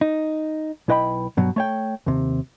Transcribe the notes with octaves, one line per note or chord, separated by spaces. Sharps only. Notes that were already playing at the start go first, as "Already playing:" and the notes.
D#4
B1 E4 B4 D#5 G5 B5
G2 B2 F#3
A3 C#5 G5
D#2 C3